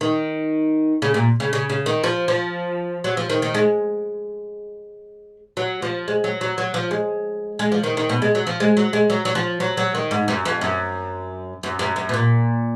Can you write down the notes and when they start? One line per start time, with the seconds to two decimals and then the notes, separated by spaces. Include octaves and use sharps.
0.01 D#3
1.02 C#3
1.14 A#2
1.40 C#3
1.53 C#3
1.69 C#3
1.86 D#3
2.04 F3
2.28 F3
3.04 F#3
3.17 F3
3.30 D#3
3.42 D#3
3.54 G#3
5.57 F#3
5.82 F3
6.08 G#3
6.24 F#3
6.41 F#3
6.58 F#3
6.74 F3
6.91 G#3
7.59 G#3
7.72 F3
7.83 D#3
7.97 D#3
8.09 B2
8.22 G#3
8.35 F#3
8.47 F3
8.60 G#3
8.77 F#3
8.93 G#3
9.10 F#3
9.25 F#3
9.35 F3
9.60 F#3
9.77 F#3
9.95 D#3
10.11 G#2
10.28 F#2
10.45 F2
10.61 F#2
11.63 F#2
11.79 F#2
11.96 F#2
12.09 B2
12.14 A#2